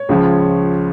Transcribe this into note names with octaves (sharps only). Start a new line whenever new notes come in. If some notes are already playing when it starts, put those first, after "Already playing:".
Already playing: C#5
C#2 C#3 F3